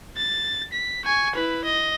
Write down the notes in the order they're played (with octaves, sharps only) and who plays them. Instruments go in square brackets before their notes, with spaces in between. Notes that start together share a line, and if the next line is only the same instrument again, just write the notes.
[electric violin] A6
B6
G#5 C#6
E4 B4
D#5